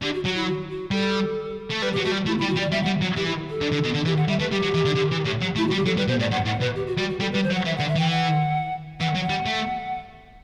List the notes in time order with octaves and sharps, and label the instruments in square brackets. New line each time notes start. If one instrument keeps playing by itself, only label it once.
[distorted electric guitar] D3 [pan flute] G4
[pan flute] F#4
[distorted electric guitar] F#3 [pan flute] F#4
[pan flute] E4
F#4
F#4
[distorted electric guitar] G3 [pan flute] A4
[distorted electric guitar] A3
[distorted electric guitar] G3 [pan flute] B4
[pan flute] G4
[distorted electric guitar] F#3
[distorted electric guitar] A3 [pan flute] F#4
[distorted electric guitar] G3
[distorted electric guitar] A3 [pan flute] E4
[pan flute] E4
[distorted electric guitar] G3
[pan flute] F#4
[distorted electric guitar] G3
[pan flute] D5
[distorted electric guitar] G3 [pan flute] E5
[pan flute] F#5
[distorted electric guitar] G3
F#3
[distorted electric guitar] E3 [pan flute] G4
[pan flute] E4
A4
[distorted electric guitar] D3
D3
B2
D3
[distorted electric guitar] E3 [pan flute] G4
[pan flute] F#5
[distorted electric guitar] G3 [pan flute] E5
[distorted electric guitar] A3 [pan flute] B4
[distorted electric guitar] G3 [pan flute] G4
[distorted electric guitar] F#3
E3
D3
D3
E3
A2
F#3
[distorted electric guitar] A3 [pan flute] E4
[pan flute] F#4
[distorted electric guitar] G3
[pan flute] G4
[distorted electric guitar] F#3 [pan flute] A4
[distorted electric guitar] G3 [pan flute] B4
[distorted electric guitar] B2 [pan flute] C5
[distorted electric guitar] A2 [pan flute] D5
[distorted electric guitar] G2 [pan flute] F#5
[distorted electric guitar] A2 [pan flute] F#5
[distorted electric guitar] B2 [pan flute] B4
[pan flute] G4
F#4
[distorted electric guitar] G3 [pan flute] F#4
[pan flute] F#4
[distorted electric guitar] G3 [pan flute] A4
[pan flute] B4
[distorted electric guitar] G3
[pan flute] C5
[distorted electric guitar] F#3
[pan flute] F#5
[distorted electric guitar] E3 [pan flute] E5
[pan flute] F#5
[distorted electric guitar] D3
[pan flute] E5
[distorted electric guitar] E3 [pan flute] G5
[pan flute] F#5
[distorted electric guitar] E3 [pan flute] F#5
[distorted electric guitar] F#3
[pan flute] F#5
[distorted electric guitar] G3
A3